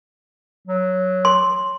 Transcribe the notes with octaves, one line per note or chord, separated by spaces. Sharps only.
F#3
C6